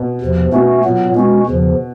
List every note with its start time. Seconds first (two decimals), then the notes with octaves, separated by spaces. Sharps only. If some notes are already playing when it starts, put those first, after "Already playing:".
Already playing: B2
0.21 E2 C3 F3
0.52 B2 A3 C#4 F#4
0.83 A#2 F#3 B3
1.15 B2 G#3 C#4 F#4
1.47 E2 C#3 F3